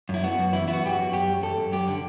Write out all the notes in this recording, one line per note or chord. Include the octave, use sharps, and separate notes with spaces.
F#2 E4
B3 F#4
F#2
E3 E4
B3 E4
F#4
F#2 G4
F#4
F#2
F#2 G4
F#2
F#2 A4
F#2
F#2 G4
D3